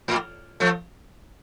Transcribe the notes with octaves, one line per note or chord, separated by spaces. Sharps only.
A2
F3 A3